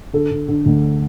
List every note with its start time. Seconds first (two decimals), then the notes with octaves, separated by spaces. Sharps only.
0.13 D3 A4
0.31 D3
0.48 D3
0.66 D2